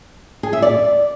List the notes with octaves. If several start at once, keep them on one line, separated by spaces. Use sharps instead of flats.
G#4
E5
D5